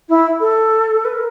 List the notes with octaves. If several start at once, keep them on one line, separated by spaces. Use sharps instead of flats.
E4
A4
B4
A#4